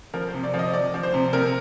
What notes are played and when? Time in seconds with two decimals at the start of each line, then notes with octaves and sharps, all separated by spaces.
0.14 F3 A#4
0.29 C5
0.34 C3
0.44 D5
0.54 F3
0.59 D#5
0.73 F3 D5
0.94 F3
1.03 C5
1.14 C3
1.33 C3 A#4